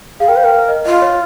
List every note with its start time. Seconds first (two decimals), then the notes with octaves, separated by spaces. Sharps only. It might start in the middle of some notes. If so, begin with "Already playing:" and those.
0.20 G#4 F5
0.28 A#4 G5
0.36 C5 F5
0.44 A#4 G5
0.52 F5
0.69 D#5
0.86 F4 D#5
1.02 C#5